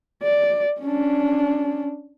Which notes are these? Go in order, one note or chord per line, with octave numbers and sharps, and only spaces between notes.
D5
C#4 D4